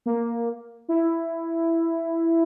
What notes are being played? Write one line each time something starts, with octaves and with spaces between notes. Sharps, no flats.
A#3
E4